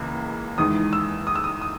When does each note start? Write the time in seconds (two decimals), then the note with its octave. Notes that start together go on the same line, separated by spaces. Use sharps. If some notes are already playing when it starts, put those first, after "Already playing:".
Already playing: C#2 C#3 E3 A#3
0.58 E2 D#3 G#3 D#6
0.93 E6
1.27 D#6
1.36 E6
1.44 D#6
1.61 D#6